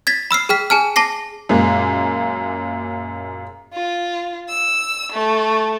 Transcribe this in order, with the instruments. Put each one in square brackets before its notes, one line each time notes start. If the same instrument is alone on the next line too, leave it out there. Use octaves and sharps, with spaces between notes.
[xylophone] G#6 A6 B6
B5 E6 F6 C7
G#4 G5 F6 B6
G#4 G#5 A5 F6
A5 D6 A#6 C7
[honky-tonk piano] F#2 A#2 G#3 A#3
[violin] F4
E6
A3